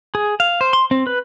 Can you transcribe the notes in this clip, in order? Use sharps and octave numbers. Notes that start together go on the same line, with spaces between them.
G#4
F5
C5
C6
C4
B4